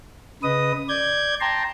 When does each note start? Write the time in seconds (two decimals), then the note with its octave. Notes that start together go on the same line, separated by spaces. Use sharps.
0.43 C#3 B4 D#5 D#6
0.89 D5 G6 G#6
1.40 G5 A5 A#5 C6